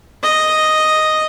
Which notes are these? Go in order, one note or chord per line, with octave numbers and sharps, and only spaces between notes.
D#5